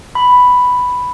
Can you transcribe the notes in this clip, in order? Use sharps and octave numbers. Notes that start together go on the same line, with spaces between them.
B5